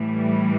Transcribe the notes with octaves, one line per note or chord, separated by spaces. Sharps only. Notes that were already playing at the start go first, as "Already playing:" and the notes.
Already playing: A2 E3 G3